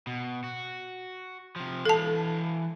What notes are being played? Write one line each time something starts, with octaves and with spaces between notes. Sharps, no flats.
B2
F#4
C3 F3
E3 A4 F5 A5